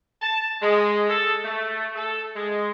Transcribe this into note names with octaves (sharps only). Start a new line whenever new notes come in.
A5
G#3
A4
A3
A4
G#3